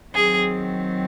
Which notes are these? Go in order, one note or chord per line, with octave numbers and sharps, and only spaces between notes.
D#3 F#3 C4 G#4